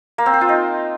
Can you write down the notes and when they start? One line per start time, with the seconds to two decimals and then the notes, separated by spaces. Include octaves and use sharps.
0.18 A#3
0.26 C4
0.34 C5
0.41 F4
0.49 D#4